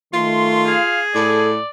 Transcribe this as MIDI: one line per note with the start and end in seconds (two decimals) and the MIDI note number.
0.14 0.76 51
0.14 0.76 57
0.14 1.02 65
0.14 0.63 84
0.66 1.48 68
0.66 1.01 77
1.15 1.57 45
1.15 1.50 69
1.15 1.69 74